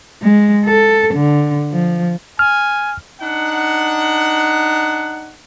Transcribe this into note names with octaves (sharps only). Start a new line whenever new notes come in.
G#3
A4
D3
F3
G#5 F6
D4 D#4 F#5